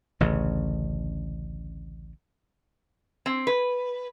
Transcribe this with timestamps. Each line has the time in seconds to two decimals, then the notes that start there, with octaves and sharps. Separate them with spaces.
0.20 A1 D2 C#3
3.26 C4
3.47 B4